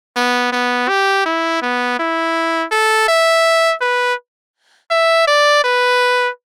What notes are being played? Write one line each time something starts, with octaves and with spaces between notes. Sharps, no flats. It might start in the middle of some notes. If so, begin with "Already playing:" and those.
B3
B3
G4
E4
B3
E4
A4
E5
B4
E5
D5
B4